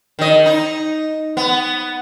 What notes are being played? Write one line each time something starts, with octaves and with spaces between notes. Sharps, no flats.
D#3 D#5
D#4
B3